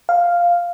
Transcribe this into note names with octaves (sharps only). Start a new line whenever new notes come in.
F5